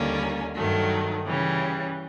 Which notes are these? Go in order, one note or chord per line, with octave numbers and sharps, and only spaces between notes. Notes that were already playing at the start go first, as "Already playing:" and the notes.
Already playing: D#2 D3 G3 A#3 C#4
G2 D#3 F#3 A3
C#3 E3 G3